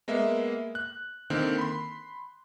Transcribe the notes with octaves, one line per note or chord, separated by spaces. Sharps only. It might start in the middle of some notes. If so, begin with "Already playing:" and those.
G#3 A#3 B3 E5
F#6
D3 D#3 A#3 C4
B5 C6